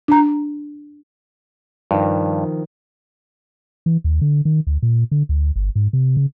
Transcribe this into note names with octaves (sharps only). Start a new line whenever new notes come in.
D4 A#5
G2 D#3 F3
E3
D#2
D3
D#3
D2
A#2
D3
D2
G1
G#2
C3
C#3